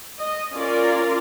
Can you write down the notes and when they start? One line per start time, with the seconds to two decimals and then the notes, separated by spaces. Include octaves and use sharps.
0.18 D#5
0.53 C#4 F4 A#4 D5